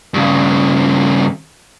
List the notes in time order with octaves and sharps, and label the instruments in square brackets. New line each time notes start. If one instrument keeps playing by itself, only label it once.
[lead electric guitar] G2 C#3